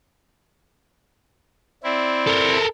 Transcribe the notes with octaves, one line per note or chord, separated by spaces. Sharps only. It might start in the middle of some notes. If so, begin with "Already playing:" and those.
C4 E4 D5
A4 A#4